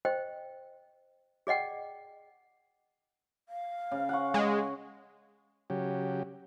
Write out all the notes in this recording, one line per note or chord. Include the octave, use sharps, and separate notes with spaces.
C5 D#5 G5
G#4 D5 D#5 F#5 G5
F5
C#3
F#5 C#6
G#3
C#3 F#3 G4